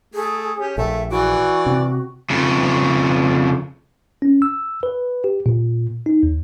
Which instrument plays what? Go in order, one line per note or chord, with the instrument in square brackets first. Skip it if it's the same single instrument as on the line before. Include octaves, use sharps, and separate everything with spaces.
[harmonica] A3 [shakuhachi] G#4
[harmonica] C#4 G4
[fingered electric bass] A#1 [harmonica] A3 [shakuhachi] E5
[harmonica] E3 D5 D6 [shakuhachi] F#4
[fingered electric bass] C3
[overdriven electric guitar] F2 C#3
[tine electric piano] C#4
E6
B4
G4
A#2
D#4
D#2